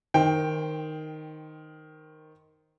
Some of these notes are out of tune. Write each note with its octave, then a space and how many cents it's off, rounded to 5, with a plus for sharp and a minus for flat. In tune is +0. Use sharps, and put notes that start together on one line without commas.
D#3 +0 C5 +0 G5 +0